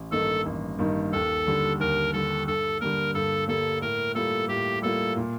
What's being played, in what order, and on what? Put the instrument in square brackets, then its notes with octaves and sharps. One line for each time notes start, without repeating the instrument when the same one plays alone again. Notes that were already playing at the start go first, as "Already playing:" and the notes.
Already playing: [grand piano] A1
[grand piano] G2 D#3 A#3 D#4 [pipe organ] A4
[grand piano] A1
G2 D#3 A#3 D#4
[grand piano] D#2 [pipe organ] A4
[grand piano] D3 G3
[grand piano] D#2 [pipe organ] A#4
[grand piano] D3 G3 [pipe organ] A4
[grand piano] G2 [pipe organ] A4
[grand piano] D3 G3 A#3 [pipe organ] A#4
[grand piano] G2 [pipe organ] A4
[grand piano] D3 G3 A#3 [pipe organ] A4
[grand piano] A2 [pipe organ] A#4
[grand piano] G3 A#3 F4 [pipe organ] A4
[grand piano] A2 [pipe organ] G4
[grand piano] G3 A#3 F4 [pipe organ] A4
[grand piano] A#2